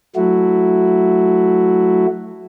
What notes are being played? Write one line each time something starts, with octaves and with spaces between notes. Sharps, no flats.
F#3 A3 E4 F#4